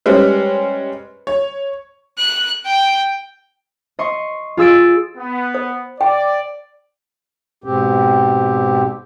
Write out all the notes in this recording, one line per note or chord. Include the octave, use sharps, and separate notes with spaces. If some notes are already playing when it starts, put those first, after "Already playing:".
G3 G#3 C#4 B4 C5
C#5
F#6
G5
D#5 C6 C#6
F4 G#4 E6 A6 D7
B3
C5
D5 G5
G#2 B2 C4 G4